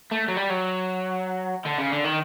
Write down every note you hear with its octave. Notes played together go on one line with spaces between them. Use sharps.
A3
F#3
G3
F#3
D3
C#3
D3
D#3